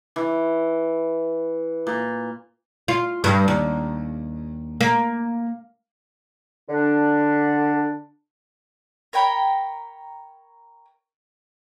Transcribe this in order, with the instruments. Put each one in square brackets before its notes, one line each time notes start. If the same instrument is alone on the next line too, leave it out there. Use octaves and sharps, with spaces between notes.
[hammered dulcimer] E3
A#2
[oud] F4
G2
D#2
A#3
[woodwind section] D3 D4
[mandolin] A#4 C#5 G5 B5